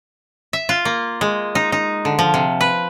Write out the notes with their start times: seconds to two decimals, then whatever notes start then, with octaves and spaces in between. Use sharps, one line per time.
0.53 E5
0.69 F4
0.85 A#3
1.21 G#3
1.55 D#4
1.72 D#4
2.05 D3
2.19 F3
2.34 C3
2.61 B4